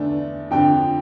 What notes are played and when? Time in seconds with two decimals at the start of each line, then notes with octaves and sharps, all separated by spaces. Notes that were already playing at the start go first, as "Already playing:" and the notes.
Already playing: E2 D3 A3 D4
0.51 F2 D3 F3 G5